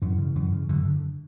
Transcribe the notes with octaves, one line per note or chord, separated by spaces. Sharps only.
F#2 E3
C#3
F#2
C#3
F#2 D3
D3